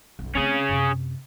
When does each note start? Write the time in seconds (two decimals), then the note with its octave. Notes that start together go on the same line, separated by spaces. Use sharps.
0.19 B1 F#2
0.35 A3 C4 C#4 G#4
0.69 F#2 C3